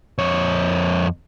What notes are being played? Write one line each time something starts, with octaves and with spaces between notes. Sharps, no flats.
F2 C#5